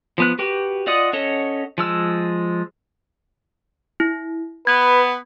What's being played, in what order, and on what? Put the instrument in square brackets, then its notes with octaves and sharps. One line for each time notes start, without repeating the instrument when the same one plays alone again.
[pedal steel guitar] F3 B3 F#6
F#4 G4 B4
F4 D5 D#5 F#5 D#6
C#4 A4 C#5 D#5 F#5
F3 G#3 E6
[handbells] E4
[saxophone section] B3 [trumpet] B4 [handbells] G#6